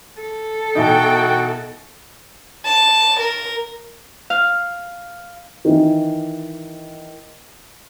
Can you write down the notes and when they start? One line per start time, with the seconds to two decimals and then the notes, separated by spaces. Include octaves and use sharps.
0.21 A4
0.75 B2 E3 D#4 F#4 G5
2.66 A5
3.20 A#4
4.30 F5
5.65 D#3 E3